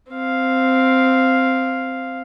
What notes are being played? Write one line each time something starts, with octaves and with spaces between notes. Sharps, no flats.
C4 F5